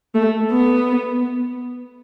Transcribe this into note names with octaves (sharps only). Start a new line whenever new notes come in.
A3
B3